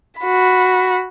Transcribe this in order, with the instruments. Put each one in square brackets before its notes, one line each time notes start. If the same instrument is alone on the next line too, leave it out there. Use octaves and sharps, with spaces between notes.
[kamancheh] F#4 B5